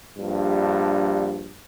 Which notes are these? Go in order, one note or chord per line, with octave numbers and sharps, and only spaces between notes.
A#1 G2